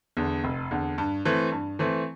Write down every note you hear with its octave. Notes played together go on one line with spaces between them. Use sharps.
E2 D3
F1
E2 D3
G2
E3 A3 C4
G2
E3 A3 C4